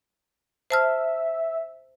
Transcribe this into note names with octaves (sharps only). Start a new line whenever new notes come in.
C5 E5 A5 F6